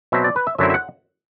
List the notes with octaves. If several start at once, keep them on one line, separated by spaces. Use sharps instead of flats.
B2 F#3 C4 E5
D5
B4
E5
F#2 D3 F#3 C4 E4 E5
E5
F#5